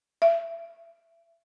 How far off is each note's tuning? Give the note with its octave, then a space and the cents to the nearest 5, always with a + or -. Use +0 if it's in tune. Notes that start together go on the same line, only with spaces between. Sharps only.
E5 +25